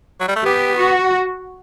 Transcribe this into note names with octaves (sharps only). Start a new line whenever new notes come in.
F#3
G3
A3
B3 G4
F#4